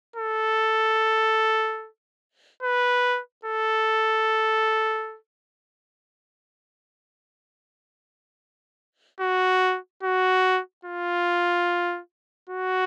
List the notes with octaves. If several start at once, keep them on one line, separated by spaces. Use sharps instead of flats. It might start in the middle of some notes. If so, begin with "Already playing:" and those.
A4
B4
A4
F#4
F#4
F4
F#4